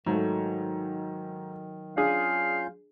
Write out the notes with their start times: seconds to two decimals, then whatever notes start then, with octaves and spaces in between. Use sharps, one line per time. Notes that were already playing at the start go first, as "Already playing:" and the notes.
0.06 G#2 D#3 F#3 A3
1.97 C#4 D4 F4 G#4 F5 G6